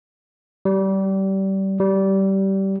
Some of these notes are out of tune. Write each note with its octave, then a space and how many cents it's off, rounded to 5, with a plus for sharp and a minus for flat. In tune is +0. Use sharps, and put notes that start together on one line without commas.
G3 -25
G3 -20